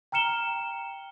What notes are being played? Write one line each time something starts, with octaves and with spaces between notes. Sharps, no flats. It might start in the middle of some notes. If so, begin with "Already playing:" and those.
G5 A#5 F6 C#7 E7 G7